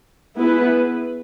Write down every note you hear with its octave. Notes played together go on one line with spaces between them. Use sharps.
B3 E4 G#4 B4